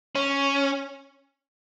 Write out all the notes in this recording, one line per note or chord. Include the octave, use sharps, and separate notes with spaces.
C#4